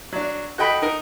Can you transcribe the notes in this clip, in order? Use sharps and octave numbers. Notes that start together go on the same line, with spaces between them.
F#3 D4
F#4 A4 D#5 G5 B5
D#4 A#4